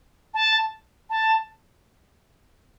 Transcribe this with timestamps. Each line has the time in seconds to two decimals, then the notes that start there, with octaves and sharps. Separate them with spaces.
0.34 A5
1.10 A5